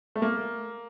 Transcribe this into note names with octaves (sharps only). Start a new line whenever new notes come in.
A3
A#3